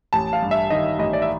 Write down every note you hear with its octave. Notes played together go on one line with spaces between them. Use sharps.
A1 A5
F5
G2
E5
D#3 D#5
A1 D#5
D5
E5